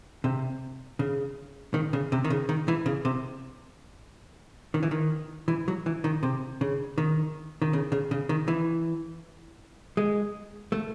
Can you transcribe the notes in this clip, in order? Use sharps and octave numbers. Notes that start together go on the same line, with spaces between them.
C3
C#3
D#3
C#3
C3
D#3
C#3
D#3
E3
C#3
C3
D#3
E3
D#3
E3
F#3
E3
D#3
C3
C#3
D#3
D#3
C#3
C#3
C#3
D#3
E3
G#3
A3